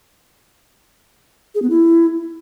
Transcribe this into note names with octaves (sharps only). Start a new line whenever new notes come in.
G#4
B3
E4